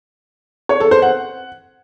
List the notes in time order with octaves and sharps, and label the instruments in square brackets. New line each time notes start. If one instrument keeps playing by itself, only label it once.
[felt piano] C#5
A4
C5
F#5